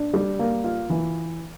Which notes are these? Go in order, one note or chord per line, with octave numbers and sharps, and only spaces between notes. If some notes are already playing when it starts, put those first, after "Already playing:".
Already playing: D4
G3
A#3
F4
E3